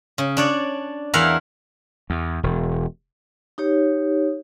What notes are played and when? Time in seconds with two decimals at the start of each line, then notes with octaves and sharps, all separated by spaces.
0.18 C#3
0.37 D4 C#5 D5
1.14 E2 E4 A#4 F5 F#5
2.10 E2
2.43 E1
3.58 D#4 G4 C#5